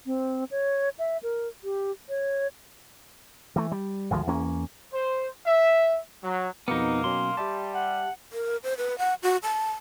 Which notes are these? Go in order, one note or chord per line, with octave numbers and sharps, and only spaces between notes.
C4
C#5
E5
A#4
G4
C#5
E3 A3
G3
G#1 D2 F3 G#3
E2 A#3 C#4
C5
E5
F#3
F2 B2 D#3 A#3 B3 D#4 C#7
B2 F#3 C#4 C6
G3 G4 E5 A5
F#5
A#4
C5
B4
F#5
F#4
A5